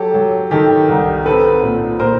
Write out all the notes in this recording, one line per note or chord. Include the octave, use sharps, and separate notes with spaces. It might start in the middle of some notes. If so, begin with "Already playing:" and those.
Already playing: F#3 G4 A4
F#3
D#3 G4 A4
C2
C4 A4 B4
A#2
A#2 A#4 C5